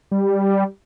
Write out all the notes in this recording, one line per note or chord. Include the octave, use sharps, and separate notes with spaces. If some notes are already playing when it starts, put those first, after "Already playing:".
G3